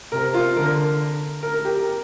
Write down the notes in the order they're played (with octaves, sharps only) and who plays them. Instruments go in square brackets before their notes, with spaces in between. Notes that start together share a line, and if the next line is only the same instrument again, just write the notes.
[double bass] C3 [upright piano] A#4
[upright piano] F4
[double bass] D3 [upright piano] A#4
[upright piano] A#4
A#4
G4
A#4